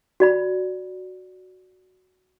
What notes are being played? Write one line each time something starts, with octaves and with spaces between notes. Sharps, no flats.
F#4 D5 B5